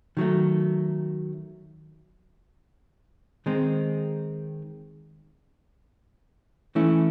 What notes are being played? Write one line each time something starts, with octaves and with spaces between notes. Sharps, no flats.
D#3 F#3 A3
D#3 G#3 C4 D#4
E3 A3 C#4 E4